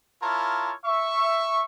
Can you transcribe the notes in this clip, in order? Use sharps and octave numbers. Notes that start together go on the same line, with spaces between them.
E4 F4 A#4 C#5 A5
E5 C#6